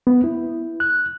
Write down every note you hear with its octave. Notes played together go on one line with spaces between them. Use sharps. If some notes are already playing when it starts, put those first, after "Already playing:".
B3
E4
F#6